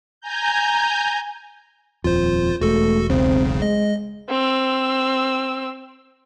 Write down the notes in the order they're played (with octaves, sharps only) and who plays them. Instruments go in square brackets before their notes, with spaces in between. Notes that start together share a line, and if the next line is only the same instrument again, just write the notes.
[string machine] G#5 A#5 G6
[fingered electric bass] D#1 F2 [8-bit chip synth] F4 C5
[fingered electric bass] E1 G#3 [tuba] A3 [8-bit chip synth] F#4 A4
[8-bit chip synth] B1 E2 C#3 [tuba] C4
[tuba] G#3 [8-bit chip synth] D#5
[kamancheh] C4 E6